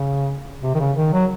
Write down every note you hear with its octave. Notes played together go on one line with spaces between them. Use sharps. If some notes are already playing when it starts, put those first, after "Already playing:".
Already playing: C#3
C3
D#3
C#3
D#3
F#3